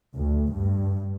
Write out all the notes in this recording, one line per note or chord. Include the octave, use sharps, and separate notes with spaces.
D2
G2